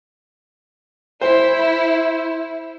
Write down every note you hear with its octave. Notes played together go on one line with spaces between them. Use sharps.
E4 C5